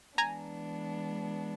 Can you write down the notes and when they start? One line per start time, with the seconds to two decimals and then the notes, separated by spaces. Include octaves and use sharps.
0.17 E3 G#3 B3 D4 G#5 A#5